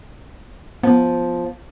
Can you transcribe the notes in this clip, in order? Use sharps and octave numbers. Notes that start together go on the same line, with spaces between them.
F3 B3